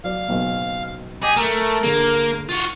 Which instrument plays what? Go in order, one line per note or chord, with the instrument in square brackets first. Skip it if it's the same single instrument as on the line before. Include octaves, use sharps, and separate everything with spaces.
[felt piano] F#3 D5 [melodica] F5
[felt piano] F#1 B1
[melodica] G4 D#5 [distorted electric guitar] G#4
[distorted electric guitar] A3 [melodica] A#4
[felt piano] D3 G#4 [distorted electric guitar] A#3
[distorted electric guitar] F4 F#4 [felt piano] D#7